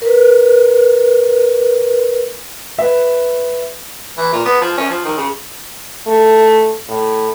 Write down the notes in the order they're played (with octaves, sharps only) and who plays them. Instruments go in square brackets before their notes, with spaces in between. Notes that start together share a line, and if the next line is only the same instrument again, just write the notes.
[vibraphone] A#4 B4
[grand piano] B4 E5
[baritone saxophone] E3
A#2
B3
F3
C#4
F3
D#3
C#3
[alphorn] A3
A2